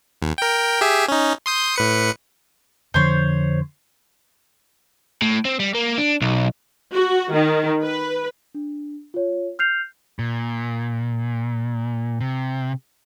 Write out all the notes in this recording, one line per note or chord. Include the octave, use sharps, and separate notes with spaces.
D#2
A#4 G5
G4 G#4 E5
C#4 D#4
C6 D#6 G6
A2 B4 C#7
F2 D3 F3 C5 C#5
A2
C4
G3
A#3
D4
B1
F#4
D#3
B4
D4
F4 C#5
F6 G6 C7 F7
A#2
C3